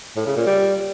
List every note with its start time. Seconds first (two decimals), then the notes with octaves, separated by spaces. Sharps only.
0.16 A2
0.26 C#3
0.36 A#2
0.47 G3